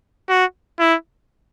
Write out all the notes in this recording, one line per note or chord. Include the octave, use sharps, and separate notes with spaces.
F#4
E4